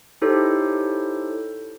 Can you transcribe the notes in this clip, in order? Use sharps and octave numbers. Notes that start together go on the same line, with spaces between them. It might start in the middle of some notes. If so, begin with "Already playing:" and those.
D#4 E4 G4 A4 C5 C#5